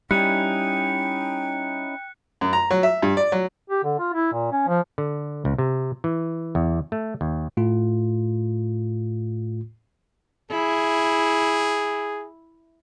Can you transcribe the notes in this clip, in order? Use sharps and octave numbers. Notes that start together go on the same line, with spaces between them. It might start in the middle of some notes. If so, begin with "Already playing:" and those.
G3 C#4 D#4 E4 G5 F#6 C#7
F#2
A#5
F#3
E5
G2
D5
F#3
G4
D3
F4
E4
A#2
C#4
F3
D3
C#2
C3
E3
E2
A3
D#2
A2 A3 F4
E4 G#4